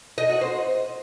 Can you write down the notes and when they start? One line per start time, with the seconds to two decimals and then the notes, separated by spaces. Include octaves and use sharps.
0.18 D#5
0.30 F#4
0.41 C5